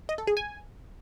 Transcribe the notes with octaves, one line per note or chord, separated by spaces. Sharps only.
D#5
A4
G#4
G#5